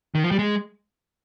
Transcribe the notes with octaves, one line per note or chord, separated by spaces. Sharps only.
D#3
F3
G3
G#3